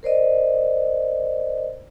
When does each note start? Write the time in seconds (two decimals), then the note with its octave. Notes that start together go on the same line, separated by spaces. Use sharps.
0.03 A#4 C5 D5 D#5